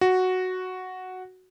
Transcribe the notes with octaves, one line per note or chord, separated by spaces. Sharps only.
F#4